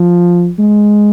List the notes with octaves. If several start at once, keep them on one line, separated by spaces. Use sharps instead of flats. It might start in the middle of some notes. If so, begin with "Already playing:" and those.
Already playing: F3
G#3